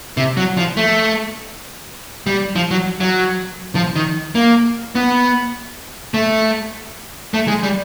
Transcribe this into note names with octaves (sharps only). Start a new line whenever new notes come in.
C3
F#3
F3
A3
G3
F3
F#3
F#3
F3
D#3
A#3
B3
A3
A3
G#3
G3